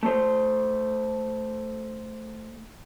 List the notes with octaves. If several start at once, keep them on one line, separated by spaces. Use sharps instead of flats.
A3 C5